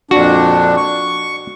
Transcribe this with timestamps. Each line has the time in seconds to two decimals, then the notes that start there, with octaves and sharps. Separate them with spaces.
0.11 F2 A#2 D4 F#4
0.76 C#6